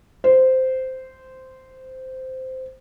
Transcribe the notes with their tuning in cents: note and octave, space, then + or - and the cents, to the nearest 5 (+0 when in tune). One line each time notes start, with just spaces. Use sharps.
C5 -10